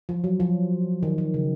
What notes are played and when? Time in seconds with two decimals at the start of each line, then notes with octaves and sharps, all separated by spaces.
0.09 F3
0.24 F#3
0.40 F3
1.03 D#3
1.18 D#3
1.34 C#3